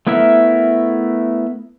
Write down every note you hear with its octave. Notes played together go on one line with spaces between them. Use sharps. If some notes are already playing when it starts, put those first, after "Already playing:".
A3 B3 E4 A#4 E5